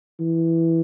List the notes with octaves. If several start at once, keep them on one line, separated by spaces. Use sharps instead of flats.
E3